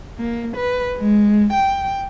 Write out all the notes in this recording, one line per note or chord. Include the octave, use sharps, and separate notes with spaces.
A#3
B4
G#3
G5